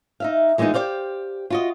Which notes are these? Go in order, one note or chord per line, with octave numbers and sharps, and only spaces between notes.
D#4 E5 F5
E3 G#3 A#3 B3 D#4 F4
G4 C5 D5 F5
F4 F#4 D#5